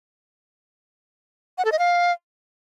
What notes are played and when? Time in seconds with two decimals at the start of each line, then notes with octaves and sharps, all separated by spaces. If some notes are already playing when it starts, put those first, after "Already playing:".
1.58 F#5
1.65 A4
1.72 D#5
1.79 F5